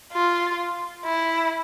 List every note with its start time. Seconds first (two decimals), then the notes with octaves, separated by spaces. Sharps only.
0.13 F4
1.06 E4